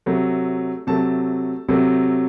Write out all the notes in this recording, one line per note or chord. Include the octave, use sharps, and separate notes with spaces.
C3 F#3 A3
C3 F#3 A3 A5
C3 F#3 A3